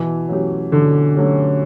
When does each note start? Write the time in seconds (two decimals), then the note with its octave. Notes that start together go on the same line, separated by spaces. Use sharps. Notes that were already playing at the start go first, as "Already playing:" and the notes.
Already playing: B2 E3
0.29 F#3 A3 C#4 G4
0.72 B2 D3
1.15 F#3 A3 C#4 G4